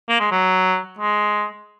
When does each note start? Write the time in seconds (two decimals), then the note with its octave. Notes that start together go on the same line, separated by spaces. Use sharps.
0.09 A#3
0.20 G#3
0.31 F#3
0.99 G#3